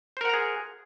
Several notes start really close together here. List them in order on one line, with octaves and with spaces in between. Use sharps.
C5 A#4 F#5 A#5 G#4